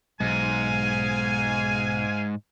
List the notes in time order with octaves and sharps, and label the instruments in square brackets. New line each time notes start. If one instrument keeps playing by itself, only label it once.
[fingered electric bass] B1 [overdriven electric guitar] G#2 [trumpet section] F5 G#5